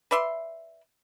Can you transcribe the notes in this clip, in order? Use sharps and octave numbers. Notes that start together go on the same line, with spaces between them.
B4 D5 E5 C6